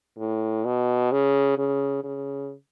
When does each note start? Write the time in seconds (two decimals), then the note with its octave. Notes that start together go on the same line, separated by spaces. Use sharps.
0.19 A2
0.65 B2
1.12 C#3
1.58 C#3
2.04 C#3